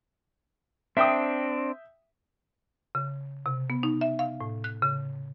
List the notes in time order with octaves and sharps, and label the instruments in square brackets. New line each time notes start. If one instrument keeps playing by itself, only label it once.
[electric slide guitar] C4 D4 [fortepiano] E5 G5 D#6
[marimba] C#3
C3
B3
D#4
E5
F5
A2
F#6
C#3